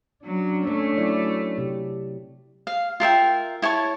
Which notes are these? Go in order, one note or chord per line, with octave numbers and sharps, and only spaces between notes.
F#3 C#4 D4
A3 C#5
F#3 E4 D5
C3 G4
F5
F4 A#4 E5 G5
E4 C#5 A5 C#6